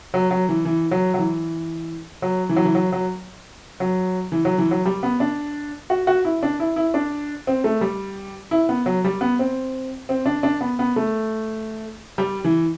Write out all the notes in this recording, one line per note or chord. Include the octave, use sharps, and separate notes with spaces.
F#3
F#3
E3
E3
F#3
F#3
E3
F#3
E3
F#3
E3
F#3
F#3
F#3
E3
F#3
E3
F#3
G3
B3
D4
F#4
F#4
E4
D4
E4
E4
D4
C4
A3
G3
E4
B3
F#3
G3
B3
C4
C4
D4
D4
B3
B3
A3
G3
E3